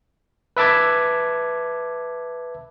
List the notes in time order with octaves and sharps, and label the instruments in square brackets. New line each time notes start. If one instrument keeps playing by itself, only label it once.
[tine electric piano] B4 E5 A5 D6 G#6